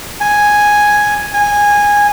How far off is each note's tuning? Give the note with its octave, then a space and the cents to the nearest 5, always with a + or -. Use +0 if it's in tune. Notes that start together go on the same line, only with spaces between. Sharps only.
G#5 +0
G#5 -15